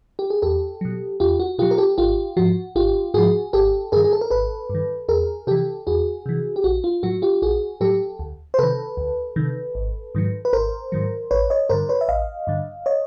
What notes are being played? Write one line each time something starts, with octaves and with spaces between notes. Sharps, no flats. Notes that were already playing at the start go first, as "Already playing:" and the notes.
G4
G#4
E2 G4 A4
B2 F#3
E2 F4 G4
F#4
B2 F#3 F4 G4
A#4
G4 A4
G#1 F4 G4
G#2 F3 F#4
G#1 F4 G4
G#2 F3 F#4 G#4
G#1 G4 A4
G2 D#3 G#4 A#4
G#4
A4
A#4
G#1 A4 B4
G2
D#3
E2 G#4 A#4
C3 E3 G4 A4
E2 F#4 G#4
C3 E3
G4
A#1 F#4
F4
A2 F#3 F#4
F4 G4
A#1 F#4 G#4
A2 F#3 G4 A4
D2
C5
C3 D#3 A4 B4
D2
C3 D#3
G#1
G#2 D#3 F#3
B4
G#1 A#4 C5
G#2 D#3 F#3
A1 B4 C#5
C#5 D#5
G2 D3 A#4 C5
B4 C#5
E5
A1 D#5 F5
G2 D3
C#5 D#5